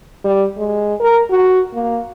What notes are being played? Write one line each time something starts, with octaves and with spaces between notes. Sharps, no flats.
G3
G#3
A#4
F#4
A#3